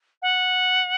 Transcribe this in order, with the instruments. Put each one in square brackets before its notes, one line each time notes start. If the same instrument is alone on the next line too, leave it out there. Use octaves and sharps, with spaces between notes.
[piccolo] F#5